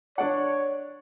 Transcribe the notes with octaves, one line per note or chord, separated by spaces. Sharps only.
D4 C#5 D5 F#5